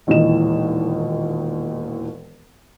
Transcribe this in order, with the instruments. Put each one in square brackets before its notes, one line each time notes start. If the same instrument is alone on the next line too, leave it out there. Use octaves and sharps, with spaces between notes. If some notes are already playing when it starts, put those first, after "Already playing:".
[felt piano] E1 D#2 A#2 E3 D#5 E7